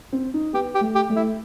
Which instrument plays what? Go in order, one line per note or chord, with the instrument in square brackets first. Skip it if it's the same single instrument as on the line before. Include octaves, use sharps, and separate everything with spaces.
[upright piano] C4
D#4
[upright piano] B3 [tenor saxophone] G4
[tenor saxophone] G4
[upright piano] A3
[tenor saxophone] G4
[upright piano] A3
[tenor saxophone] E4